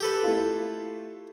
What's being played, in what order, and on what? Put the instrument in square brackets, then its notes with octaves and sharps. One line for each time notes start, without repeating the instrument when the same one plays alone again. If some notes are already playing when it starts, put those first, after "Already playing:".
[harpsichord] G4 A4 B4
[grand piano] A3 E4 F4